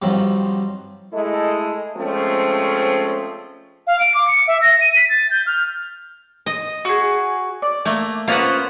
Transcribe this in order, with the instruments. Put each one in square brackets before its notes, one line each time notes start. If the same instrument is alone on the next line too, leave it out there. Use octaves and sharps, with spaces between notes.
[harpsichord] G2 D#3 F3 F#3 C4
[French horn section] G#3 A3 E4 A4 D#5
F3 G#3 A3 C4 C#4
[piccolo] F5
D7
D6
C#7
E5
A#6
D#7
B6
A6
G6
F6
[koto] D#5
[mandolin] F#4 G#4
D5
[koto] A3 A#3
[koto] A#3 B3 F#5 [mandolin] C#4 F4 C5